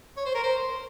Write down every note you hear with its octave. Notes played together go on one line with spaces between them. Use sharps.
C#5
C5
A#4
C5